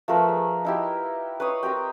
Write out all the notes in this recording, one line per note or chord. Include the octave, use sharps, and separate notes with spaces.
F3 A3 A#4 B4
G#4
D#4 E4 G4
B4 C#5 C6 D#6
C4 G4 A#4 G5